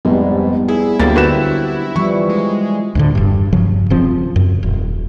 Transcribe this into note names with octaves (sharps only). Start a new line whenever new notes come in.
F1 G#2 G3 B3
E4 G#4
D2 F#3 A#3 G4 C5 A6
D3 F#4 B4 E7
E3 F3 G3 C#6
G#3
D2 A2 D3
E1 G2
G2 C#3 F3 F#3
E1 C#3 F3 C4
F#2
D#1